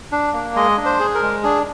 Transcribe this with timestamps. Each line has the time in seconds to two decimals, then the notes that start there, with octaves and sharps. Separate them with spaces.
0.12 D4
0.33 A#3
0.55 G#3 D#5
0.77 D4
0.86 C5
1.00 G#4
1.15 A#4
1.22 G#3
1.44 D4 G#4